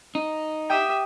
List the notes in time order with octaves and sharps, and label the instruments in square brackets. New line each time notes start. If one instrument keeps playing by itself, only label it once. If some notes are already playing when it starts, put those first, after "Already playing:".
[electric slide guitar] D#4
[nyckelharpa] G4 E5 [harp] G5 D#6